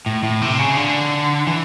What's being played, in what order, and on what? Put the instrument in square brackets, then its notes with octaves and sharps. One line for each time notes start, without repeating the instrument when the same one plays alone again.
[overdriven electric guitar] A2
A2
C3
C#3
D3
E3